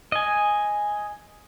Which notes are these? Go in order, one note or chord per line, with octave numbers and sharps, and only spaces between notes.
D#5 G#5